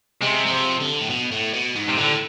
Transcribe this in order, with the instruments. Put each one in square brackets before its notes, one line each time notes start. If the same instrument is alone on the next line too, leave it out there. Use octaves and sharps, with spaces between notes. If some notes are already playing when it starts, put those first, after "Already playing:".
[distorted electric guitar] C3 [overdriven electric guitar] G#3
[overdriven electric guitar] G#3
F3
D3
A2
B2
A2
B2
G#2
[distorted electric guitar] C3
[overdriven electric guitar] A2 [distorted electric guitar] D3